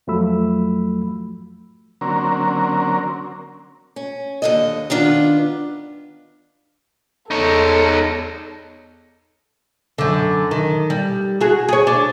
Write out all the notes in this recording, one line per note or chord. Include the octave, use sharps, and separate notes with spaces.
F2 F3 F#3 A3 B5 E6
D3 F#3 A#3 C4 C#4 A#4
C#4
D#2 D3 D#5
D#3 B3 D4 F4
E2 D#4 A4 C#5
F#2 D3
D#3
G3
F#4 G#4
G#4 C#5
D4